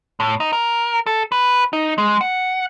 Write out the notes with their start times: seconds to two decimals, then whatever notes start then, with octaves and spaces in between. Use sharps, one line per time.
0.20 A2
0.40 D#4
0.53 A#4
1.06 A4
1.32 B4
1.73 D#4
1.98 G#3
2.21 F#5